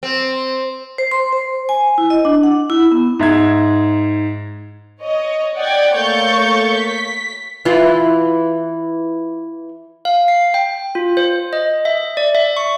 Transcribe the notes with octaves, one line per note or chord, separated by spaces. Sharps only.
C4
C5
C6
C5
G#5
E4
D#5
D4
F#5
E4
B3
G#2 E5 G#6
C#5 D#5
D5 F#5 G5 G#6
A3 A#3 C#5 C#6 G6 A6
B6
E3 F4
F5
C7
G5
F4
C5
D#5
E5
D5
E5
C#6